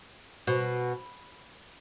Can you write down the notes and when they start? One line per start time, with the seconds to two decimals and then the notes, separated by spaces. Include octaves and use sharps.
0.47 B2